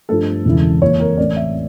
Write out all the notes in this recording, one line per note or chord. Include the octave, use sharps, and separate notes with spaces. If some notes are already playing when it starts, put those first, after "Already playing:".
G2 F3 A3 A4
E1 E2 C#3 E3
F2 E3 A#3 C#5
A#4
A1 A2 E3 A3 C#4 D5
E5